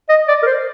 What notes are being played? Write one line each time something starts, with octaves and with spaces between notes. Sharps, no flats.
D#5
D5
A#4
C5